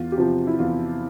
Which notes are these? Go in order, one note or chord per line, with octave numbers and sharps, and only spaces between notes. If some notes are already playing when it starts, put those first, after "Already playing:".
Already playing: E2 F4
G4
C3 F3 F4
E4
E2 F4